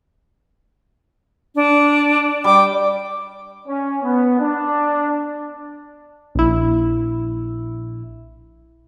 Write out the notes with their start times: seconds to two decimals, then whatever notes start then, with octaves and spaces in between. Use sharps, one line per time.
1.55 D4
2.44 G3 G5 D6
3.67 C#4
4.03 B3
4.40 D4
6.35 A#1 E4